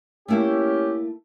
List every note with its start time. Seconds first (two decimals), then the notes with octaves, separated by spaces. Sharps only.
0.28 A3 A#3 C#4 E4 G4